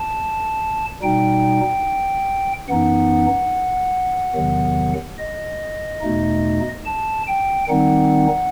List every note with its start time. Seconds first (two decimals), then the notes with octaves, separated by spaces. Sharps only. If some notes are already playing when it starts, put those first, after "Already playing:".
Already playing: A5
1.02 B2 G3 D#4 G5
2.68 F#2 E3 B3 D#4 F#5
4.35 E2 C3 D#3 F#3 B3
5.19 D#5
6.02 E2 B2 A3 D#4
6.86 A5
7.27 G5
7.69 D#3 G3 C4 D#4 F#5